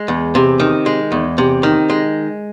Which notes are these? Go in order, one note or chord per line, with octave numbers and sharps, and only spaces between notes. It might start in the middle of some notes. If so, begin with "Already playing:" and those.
Already playing: G#3
E2
C3
D#3
G#3
E2
C3
D#3
G#3